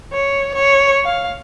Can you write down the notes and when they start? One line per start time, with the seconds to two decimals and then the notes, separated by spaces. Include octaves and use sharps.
0.13 C#5
0.54 C#5
1.05 F5